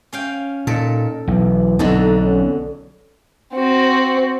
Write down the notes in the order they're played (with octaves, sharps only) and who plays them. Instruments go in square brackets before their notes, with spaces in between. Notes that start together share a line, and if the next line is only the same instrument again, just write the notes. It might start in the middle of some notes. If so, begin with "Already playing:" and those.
[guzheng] C#4 F5 G5
[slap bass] A#2 [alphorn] D#4 [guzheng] A4
[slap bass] B1 [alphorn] E3
[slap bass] B1 [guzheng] F2 D3 F#4 [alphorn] D#4
[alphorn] C#4
[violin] C4 F#4